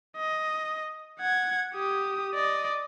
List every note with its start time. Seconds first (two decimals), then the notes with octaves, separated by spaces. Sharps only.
0.17 D#5
1.20 F#5 G#6
1.74 G4 D#6
2.34 D5 D#5